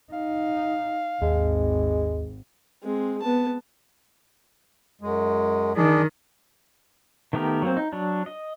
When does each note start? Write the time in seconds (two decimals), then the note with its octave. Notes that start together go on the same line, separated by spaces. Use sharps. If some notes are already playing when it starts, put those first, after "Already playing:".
0.13 D#4 F5
1.22 G#1 D#2 G#3
2.83 G#3 C4
3.22 B3 A5
5.01 F#2 G#3
5.76 D#3 D4 G#4 D5
7.33 D#3 A3 B3 G4 A#4
7.62 F#3 A#3 C4
7.77 D#4
7.92 F#3 D4
8.26 D#5